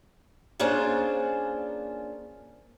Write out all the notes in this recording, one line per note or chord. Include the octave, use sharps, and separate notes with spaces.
A#3 C#4 D4 F4 G#4 C5